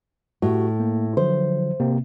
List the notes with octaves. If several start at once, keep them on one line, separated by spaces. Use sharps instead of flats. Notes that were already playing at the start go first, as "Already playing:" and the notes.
A2 F#4 G4
A#3
D3 F3 F#3 C5
C3 A#3 C4